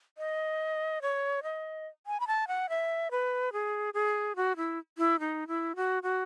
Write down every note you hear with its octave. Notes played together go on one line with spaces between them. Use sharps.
D#5
C#5
D#5
G#5
B5
A5
F#5
E5
B4
G#4
G#4
F#4
E4
E4
D#4
E4
F#4
F#4